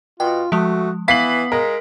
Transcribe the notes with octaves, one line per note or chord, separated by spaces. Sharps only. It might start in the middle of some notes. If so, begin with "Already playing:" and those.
B2 F4 G5
F3 G#3 A3 F#4
E3 B3 F5 B6 C7 F#7
G#3 A#4